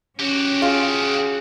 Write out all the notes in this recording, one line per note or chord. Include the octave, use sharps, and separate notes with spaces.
C#4 F#4 G4
F4 G#4